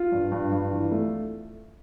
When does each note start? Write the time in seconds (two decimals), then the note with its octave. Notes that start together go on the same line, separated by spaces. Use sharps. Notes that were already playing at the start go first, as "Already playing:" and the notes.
Already playing: F4
0.12 G2
0.32 G2
0.52 G2
0.71 E3
0.92 A3